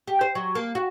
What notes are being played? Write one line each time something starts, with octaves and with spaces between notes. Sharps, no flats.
G4
C5
F#3
A#3
F#4